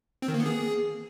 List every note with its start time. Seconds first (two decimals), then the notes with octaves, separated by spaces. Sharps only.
0.22 C4
0.28 D#3
0.34 A#3
0.40 B3
0.46 G#4